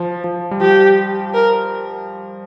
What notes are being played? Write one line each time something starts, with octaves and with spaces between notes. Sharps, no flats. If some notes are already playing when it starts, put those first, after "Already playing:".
Already playing: F3
F3
G3
F3 G4
A#4